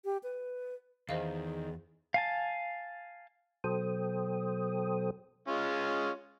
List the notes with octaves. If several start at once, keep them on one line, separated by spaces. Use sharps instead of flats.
G4
B4
E2 D#3 G#4 C5 D#5 F5
F5 G#5 A5
B2 F#3 A4 C5 G5 D#6
G#3 C#4 F4